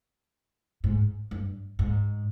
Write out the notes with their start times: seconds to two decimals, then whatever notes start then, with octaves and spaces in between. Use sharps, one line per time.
0.84 G#2
1.31 G2
1.79 G#2